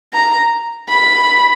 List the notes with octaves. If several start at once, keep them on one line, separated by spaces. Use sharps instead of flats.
A#5
B5